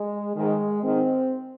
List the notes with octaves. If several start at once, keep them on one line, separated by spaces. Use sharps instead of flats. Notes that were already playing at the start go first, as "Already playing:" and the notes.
Already playing: G#3
G#2 D#3 G#3
G#2 D#3 C4